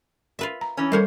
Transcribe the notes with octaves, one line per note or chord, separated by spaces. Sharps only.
F4 B4 E5
A#5
E3 C#4
G3 A#3 A4 C5 C#5